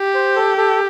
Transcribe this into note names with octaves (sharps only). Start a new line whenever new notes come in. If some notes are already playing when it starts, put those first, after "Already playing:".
Already playing: G4
C5
A4
A4